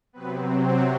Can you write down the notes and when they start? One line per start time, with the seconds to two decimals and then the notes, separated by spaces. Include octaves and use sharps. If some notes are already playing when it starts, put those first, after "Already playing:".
0.13 C3 F#3 B3 C4 B4
0.65 C4 C5